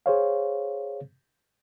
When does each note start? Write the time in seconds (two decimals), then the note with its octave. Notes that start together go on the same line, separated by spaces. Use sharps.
0.06 G#4 C5 C#5 F5